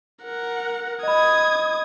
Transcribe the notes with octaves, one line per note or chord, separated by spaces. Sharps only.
A#4 F#5
D#5 B5 D#6 G#6